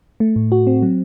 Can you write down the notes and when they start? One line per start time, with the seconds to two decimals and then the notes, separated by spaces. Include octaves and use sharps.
0.20 A3
0.36 A2
0.52 F#4
0.67 C4
0.82 F#3